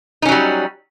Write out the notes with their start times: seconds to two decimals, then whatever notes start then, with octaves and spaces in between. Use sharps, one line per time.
0.22 D#4
0.25 C#4
0.29 F#3
0.32 G3